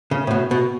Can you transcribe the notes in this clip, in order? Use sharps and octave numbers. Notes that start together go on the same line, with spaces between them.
C#3
A2
B2
B2